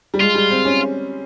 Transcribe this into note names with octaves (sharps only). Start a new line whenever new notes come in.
G3
G#3 F4
G3
C4
C#4